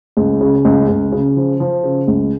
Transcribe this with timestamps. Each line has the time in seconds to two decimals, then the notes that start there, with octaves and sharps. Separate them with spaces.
0.17 C#2
0.41 C#3
0.65 C#2
0.88 C#2
1.12 C#3
1.36 F3
1.60 F3
1.83 C#3
2.08 C#2